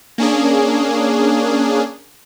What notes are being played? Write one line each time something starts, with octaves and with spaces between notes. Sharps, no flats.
A#3 C#4 D4 G#4